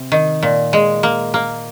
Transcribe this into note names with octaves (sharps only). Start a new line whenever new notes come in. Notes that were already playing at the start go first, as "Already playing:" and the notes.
Already playing: C3
D#3
A#2
G#3
A#3
A#3